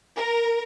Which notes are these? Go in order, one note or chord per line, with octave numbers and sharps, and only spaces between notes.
A#4